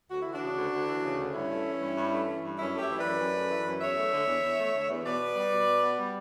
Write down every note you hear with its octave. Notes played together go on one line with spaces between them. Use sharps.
D2 F#4
E3 E4
D4 F#4
C#3
D2
D2
E3
C#3
D2
G2 C#4 E4
A3
E3
G2
G2
A3
E3
G2
F#2 C#4 E4
A3
E4 G4
E3
B4 D5
F#2
F#2
A3
E3
F#2
E2 C#5 E5
A3
D3
E2
E2
A3
D3
E2
B2 B4 D5
B3
G3
B2
B2
B3
G3